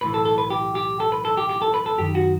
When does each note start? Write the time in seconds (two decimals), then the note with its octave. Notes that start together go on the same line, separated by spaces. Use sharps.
0.01 B1 A2 E3 B4
0.14 A4
0.25 A4
0.38 B4
0.50 G4
0.75 G4
1.00 A4
1.12 B4
1.25 A4
1.37 G4
1.49 G4
1.62 A4
1.74 B4
1.86 A4
1.98 F#2 D#3 G4
2.15 F#4